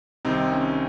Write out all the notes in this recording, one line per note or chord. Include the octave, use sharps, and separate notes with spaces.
C2 C3 D#3 C4 D#4
C#4